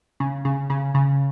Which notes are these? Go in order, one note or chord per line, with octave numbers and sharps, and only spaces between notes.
C#3
C#3
C#3
C#3